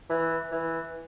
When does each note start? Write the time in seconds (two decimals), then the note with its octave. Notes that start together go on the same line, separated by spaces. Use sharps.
0.10 E3
0.52 E3